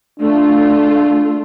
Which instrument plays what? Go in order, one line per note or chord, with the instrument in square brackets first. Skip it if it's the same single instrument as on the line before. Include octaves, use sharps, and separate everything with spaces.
[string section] A3 F4 [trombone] D4